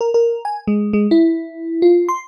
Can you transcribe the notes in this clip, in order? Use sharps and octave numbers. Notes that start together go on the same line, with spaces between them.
A#4
A#4
G#5
G#3
G#3
E4
F4
C6